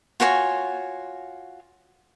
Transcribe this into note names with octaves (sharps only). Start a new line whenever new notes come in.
F4 F#4 C#5 G#5